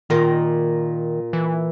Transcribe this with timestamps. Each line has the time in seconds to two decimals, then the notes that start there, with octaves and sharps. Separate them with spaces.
0.10 A#2 D#3 A#3
1.33 E3